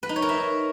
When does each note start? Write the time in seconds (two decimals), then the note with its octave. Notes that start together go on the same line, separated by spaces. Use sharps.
0.03 B4
0.09 D#4
0.16 C#5
0.22 A#4
0.29 E5